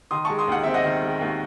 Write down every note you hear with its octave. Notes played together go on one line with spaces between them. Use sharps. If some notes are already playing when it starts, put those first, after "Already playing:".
D#3 C6 D#6
G#3 A5 C#6
C6 D#6
D#2 F#5
C4 E5
D#5 F#5
D#3
G#3
D#2